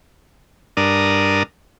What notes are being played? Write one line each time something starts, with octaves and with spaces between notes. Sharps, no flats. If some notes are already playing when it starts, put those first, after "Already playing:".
G2 D4 A#4 D#6